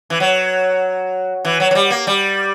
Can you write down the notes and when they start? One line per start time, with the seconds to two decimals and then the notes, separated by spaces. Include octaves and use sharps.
0.10 E3
0.20 F#3
1.45 E3
1.60 F#3
1.71 F#3
1.75 G3
1.90 A#3
2.07 G3